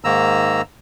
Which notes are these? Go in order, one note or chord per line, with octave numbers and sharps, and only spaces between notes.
G#2 D#3 A#3 A#5 E6